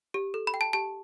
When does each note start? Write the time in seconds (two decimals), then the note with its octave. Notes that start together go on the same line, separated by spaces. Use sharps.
0.14 G4
0.34 A4
0.47 B5
0.54 G5
0.61 A5
0.73 G4 A5